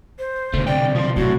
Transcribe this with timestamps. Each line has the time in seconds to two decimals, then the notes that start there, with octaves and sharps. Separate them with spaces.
0.19 C5
0.53 B2 D3 A3
0.67 B1 C3 D5 G5
0.95 F3 F4
1.16 A2 F#3 F#4